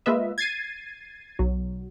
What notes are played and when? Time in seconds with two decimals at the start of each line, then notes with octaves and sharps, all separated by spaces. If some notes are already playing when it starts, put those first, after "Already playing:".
0.06 G#3 A#3 F4 B4 D#5 E5
0.38 G#6 A6 C7 D#7
1.39 B1 F#3